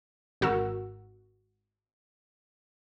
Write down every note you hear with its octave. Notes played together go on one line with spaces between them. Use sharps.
G#1 F#4 A#4 E6